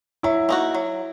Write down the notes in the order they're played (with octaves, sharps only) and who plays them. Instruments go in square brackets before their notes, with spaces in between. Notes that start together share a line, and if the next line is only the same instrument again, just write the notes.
[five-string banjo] F#3 [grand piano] E4
[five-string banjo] A#3 D#4 F#4
F#3